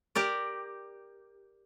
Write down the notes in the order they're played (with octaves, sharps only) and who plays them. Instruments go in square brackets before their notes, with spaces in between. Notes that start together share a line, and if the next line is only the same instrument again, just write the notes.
[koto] G4 A#4 D5